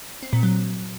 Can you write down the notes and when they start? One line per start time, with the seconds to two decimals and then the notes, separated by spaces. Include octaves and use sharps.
0.23 C4
0.33 A#2
0.43 F#3